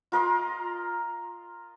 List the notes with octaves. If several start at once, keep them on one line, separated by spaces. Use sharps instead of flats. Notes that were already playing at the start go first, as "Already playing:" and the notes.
F4 A#4 D#5 C6